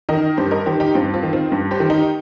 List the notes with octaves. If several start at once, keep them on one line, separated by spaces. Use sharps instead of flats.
D#3 A#4 D#5
G2 G4 C5
A#4 D#5
D#3 G4 C5
D#4 G4
G2 C4 F4
C4 F4
D#3
C4 F4
G2
G4 C5
D#3
D#4 G4